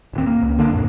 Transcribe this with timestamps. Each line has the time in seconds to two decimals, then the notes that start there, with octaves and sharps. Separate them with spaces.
0.13 D1 D#2 C4
0.26 A#3
0.42 C#2
0.59 D3 A#3 D4
0.72 F2 A2